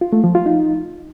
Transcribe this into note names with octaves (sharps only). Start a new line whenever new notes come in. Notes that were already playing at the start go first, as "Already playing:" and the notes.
F4
A3
F3
F4
D#4